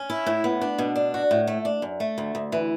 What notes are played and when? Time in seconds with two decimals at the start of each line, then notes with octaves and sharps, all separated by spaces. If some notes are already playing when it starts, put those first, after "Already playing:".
Already playing: C#4
0.10 E4
0.26 A2
0.44 B3
0.61 D4
0.78 B2
0.96 D4
1.14 F#4
1.31 A2
1.47 A3
1.65 D4
1.82 F#2
2.00 A3
2.18 D2
2.35 D2
2.52 E3